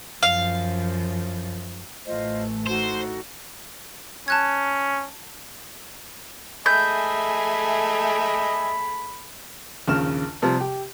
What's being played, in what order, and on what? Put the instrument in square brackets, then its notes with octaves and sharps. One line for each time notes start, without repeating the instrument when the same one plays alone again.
[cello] F#2 F3 [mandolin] F5
[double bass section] A1 E3 A3 [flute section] F4 C5 D#5
[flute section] D#4 F#4 A4 [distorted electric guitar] C5
[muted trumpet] C#4 [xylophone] A5 F#6 G#6
[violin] A3 G#4 [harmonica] D#5 E5 G#5 [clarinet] B5 [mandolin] G6
[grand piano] A#1 D#2 C#3 F6 E7
C3 F3 G3
G4